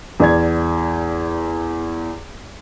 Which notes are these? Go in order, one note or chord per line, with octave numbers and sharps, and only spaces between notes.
E2 D5 G#6